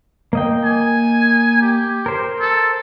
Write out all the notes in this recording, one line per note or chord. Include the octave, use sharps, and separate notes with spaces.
A#3 D#5 G5
G#5
G4
A#4 C5
A4